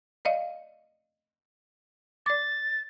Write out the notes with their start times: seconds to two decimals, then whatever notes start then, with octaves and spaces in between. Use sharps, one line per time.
0.25 D5 D#5 F5
2.26 D5 D6 A6